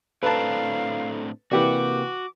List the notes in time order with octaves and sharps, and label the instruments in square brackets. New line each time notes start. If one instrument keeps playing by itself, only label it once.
[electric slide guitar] A2 C4 D4 [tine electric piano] A4 A#5 [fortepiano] B4 A5 [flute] F5
[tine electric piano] C3 A#3 [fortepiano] E3 G4 D5 [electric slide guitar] F#4 [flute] D6